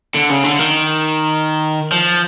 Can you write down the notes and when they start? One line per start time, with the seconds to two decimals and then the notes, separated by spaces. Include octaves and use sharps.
0.15 D3
0.31 C#3
0.44 D3
0.60 D#3
1.92 F3